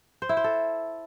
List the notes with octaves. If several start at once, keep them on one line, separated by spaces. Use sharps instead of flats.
C5
E4
C5
A4